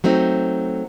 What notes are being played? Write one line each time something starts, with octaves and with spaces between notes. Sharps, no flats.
F#3 A3 C4 D#4